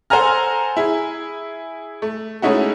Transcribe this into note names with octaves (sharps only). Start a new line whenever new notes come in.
A4 C5 F#5 G#5 A#5 F6
E4 G#4
A3
G#3 A3 C#4 D#4 E4 F#4